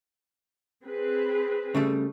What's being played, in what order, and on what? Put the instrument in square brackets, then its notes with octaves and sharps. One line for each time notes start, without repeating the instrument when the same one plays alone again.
[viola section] C4 G#4 B4
[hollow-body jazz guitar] C#3 G3 A3